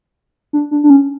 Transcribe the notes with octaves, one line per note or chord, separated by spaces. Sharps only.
D4
D4
D4
C#4